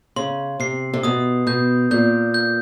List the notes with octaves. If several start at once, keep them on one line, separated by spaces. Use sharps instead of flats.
C#3 C6
C3 C7
C3
B2 D#6
B2 G6
A#2 G6
G6